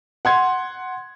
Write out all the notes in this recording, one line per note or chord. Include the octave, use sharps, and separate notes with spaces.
F#5 C6 G#6